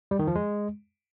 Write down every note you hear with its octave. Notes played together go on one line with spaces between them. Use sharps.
G3
D#3
F3
G#3